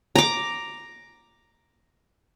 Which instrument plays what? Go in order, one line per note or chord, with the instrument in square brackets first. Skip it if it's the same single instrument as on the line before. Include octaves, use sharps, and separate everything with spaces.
[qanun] A#5 D6